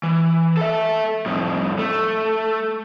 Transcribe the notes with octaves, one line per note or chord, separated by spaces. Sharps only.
E3
A4 E5
F2 A2
A3